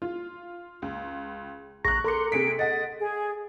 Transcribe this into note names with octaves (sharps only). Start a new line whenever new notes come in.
F4
C#2
A#1 G#4 A#5 C#6 F#6 A#6
A4 A#4 C6 D6 C#7
C3 G#4 B6 D7
D#5 F#5 A6
G#4